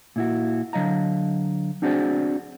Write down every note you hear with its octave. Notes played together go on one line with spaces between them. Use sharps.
A#2 E4 F#4
D3 F#3 D#5 F5 A#5
C4 D4 F#4 G#4 C5 D5